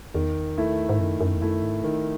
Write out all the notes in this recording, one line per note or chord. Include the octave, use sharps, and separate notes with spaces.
E2 D#3
A3 E4
G#2
F#2 D#3
F#2
E2
F#2 A3 E4
G#2
D#3